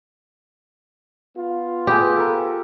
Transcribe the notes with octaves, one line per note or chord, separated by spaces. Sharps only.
B3 F4
G4 G#4 B4 D6
A4 A#4